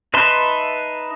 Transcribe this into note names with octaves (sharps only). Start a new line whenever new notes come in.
D#4 B4 E5 A5 C6